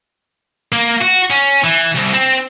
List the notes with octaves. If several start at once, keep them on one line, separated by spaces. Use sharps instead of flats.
A#3
F#4
C#4
E3
C2
C4